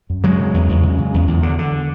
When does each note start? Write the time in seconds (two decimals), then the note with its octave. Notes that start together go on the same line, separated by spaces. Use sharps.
0.10 F#2
0.23 C#3 F#3 G#3
0.39 C#3
0.54 E2
0.69 E2
0.83 C#3
0.99 C#3
1.14 E2
1.28 E2
1.43 D3
1.59 D3